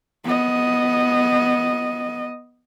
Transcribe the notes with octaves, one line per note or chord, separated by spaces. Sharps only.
B3 D#5